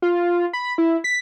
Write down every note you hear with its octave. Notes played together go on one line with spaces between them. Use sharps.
F4
B5
E4
B6